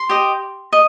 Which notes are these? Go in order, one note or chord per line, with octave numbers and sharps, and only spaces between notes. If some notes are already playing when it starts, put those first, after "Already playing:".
Already playing: C6
G4 D#5
D#5